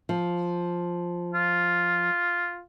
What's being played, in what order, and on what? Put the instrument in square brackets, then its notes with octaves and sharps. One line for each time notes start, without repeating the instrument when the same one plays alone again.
[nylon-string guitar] F3
[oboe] F4